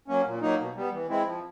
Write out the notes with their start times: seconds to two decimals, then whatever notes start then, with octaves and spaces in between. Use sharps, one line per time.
0.08 F#3 A#3 C#4
0.26 A#2
0.42 F#3 A#3 D#4
0.59 B2
0.76 G3 B3
0.93 E3
1.09 G#3 C4 E4
1.26 F3